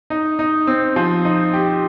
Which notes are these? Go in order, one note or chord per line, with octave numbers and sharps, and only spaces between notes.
D#4
D#4
C4
F3
D#4
G4